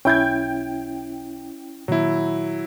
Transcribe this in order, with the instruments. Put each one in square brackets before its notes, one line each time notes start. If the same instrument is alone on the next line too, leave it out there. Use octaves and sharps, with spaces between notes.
[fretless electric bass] B1 [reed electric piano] C#4 E4 [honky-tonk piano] G5 G6 G#6
[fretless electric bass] A#2 D#3 A#3 [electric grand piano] F#3 E4